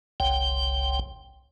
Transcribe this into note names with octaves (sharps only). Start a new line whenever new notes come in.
F#1 C2 G5